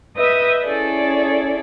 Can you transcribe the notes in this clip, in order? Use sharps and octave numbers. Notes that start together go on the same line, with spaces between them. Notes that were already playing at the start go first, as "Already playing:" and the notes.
B4 D#5 E5 D#6 G6
C#4 E4 G#4 A4 D5